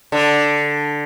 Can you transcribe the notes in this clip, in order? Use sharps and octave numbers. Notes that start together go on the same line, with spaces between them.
D3